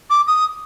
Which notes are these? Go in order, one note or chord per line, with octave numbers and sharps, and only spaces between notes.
D6
D#6